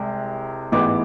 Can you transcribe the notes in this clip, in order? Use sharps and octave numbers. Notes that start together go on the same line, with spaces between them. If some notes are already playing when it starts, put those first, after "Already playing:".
Already playing: C2 C3 G#3
A1 G#2 E3 G#3 B3 D6